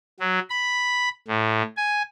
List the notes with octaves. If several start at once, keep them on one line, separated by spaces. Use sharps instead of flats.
F#3
B5
A2
G#5